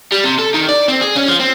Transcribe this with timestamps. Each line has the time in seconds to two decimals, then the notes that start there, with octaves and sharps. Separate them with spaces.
0.12 G3
0.24 C3
0.39 A4
0.54 D#3
0.69 D5
0.88 C4
1.01 G#4
1.15 C#4
1.27 F3
1.39 C4